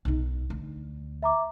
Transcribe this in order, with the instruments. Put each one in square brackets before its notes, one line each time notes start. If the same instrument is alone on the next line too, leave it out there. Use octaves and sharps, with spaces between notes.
[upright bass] B1 D#4
D2
[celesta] E5 A#5 D6